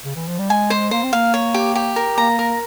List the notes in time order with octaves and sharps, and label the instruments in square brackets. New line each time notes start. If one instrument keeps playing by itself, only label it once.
[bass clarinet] C#3
E3
F3
G3
[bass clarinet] G#3 [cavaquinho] G#5
[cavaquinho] C5
[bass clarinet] A#3 [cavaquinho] C5
[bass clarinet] C4
[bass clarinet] A#3 [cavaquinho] F5
[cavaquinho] C#5
G4
G4
A#4
[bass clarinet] A#3 [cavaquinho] A#5
[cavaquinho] A#4